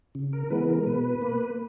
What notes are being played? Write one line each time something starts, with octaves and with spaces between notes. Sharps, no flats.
C#3
A#4
E3 G#3 B3 B4
A#4
B2 B4
A#3